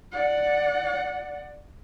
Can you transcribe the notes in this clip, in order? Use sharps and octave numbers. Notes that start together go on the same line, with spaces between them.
D5 F#5